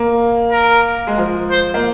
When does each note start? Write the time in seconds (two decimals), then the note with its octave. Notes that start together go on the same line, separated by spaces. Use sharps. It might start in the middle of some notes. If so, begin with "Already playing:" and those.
Already playing: A#3
0.51 A#4
1.07 G#3
1.18 F3
1.51 C5
1.74 A#3